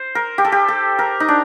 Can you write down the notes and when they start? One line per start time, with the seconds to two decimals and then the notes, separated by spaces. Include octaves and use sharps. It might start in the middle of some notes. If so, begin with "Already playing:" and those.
Already playing: C5
0.15 A#4
0.38 G4
0.45 A4
0.52 G4
0.68 A4
0.99 A#4
1.20 D#4
1.28 D4